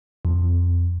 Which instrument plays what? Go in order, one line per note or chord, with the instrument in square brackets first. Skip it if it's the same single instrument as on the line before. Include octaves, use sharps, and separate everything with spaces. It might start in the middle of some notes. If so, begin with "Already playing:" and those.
[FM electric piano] F2